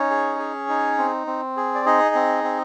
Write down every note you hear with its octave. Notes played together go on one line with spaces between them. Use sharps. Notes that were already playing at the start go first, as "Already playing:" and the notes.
Already playing: C#4 D#4 C#5
G#4
G#4
D#4
C4
C4
G#4
D5
D#4 G#4 D#5
C4
C4